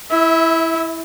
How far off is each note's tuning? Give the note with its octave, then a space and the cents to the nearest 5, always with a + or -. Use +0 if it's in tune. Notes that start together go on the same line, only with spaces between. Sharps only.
E4 +0 E5 -25